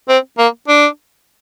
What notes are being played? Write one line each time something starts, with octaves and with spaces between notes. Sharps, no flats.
C4
A#3
D4